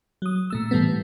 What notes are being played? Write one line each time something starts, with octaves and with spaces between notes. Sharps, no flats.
F#3 D#6
A#2 A3 E6
A2 E3 G3 A3 B3